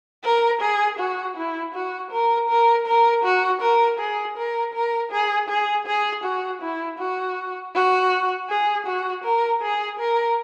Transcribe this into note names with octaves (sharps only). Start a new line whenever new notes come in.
A#4
G#4
F#4
E4
F#4
A#4
A#4
A#4
F#4
A#4
G#4
A#4
A#4
G#4
G#4
G#4
F#4
E4
F#4
F#4
G#4
F#4
A#4
G#4
A#4